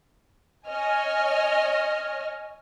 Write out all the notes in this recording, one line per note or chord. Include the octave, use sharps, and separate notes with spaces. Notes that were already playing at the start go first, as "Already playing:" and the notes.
C#5 D#5 G#5 F6